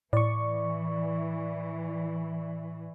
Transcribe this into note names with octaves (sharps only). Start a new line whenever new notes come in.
A2 E3 D5 C#6